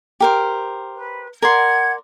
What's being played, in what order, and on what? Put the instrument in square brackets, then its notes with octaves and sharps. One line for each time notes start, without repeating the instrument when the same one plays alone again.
[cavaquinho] G4 A#4 C5
[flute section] B4
[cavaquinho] A#4 D5 C6 [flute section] F#5 G#6